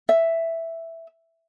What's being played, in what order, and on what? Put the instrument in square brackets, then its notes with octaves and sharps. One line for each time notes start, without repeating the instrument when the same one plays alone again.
[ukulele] E5